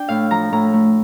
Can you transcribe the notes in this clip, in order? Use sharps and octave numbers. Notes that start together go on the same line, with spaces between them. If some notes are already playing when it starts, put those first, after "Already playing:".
Already playing: D4 G5
A2 F5
F3 A#5
A2 A#5
A3